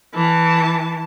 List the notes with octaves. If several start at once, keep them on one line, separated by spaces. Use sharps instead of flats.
E3 A5